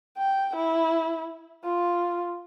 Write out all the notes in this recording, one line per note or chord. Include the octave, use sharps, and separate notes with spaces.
G5
E4
F4